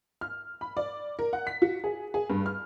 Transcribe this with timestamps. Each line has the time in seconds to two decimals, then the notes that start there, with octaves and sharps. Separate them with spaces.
0.21 F6
0.61 B5
0.77 D5
1.19 A#4
1.33 F#5
1.47 B6
1.62 F#4
1.84 G#4
2.14 G#4
2.30 G2
2.46 F6